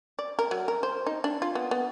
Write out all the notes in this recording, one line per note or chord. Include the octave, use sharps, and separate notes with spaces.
D5
A#4
F#3
A#4
C5
D#4
D4
F4
B3
B3